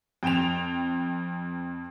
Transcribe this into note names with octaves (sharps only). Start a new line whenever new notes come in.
F2 G5 D7 E7 F7